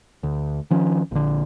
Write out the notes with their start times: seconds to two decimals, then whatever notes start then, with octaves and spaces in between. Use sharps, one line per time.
0.23 D2
0.71 D#3 F3 C#4
1.11 A#1 D3